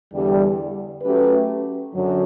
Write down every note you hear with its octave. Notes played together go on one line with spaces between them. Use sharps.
E2 D3 G3
F#3 A3 C#4 G4 B4
F#2 D3 F#3